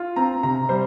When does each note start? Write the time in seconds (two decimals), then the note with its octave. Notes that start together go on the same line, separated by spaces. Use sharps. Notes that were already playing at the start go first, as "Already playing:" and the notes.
Already playing: F4
0.16 C4 A#5
0.43 C3 A#5
0.69 G3 C5